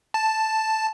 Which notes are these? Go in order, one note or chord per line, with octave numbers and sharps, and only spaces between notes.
A5